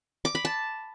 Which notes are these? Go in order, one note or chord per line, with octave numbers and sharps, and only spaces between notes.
D6
B5
A5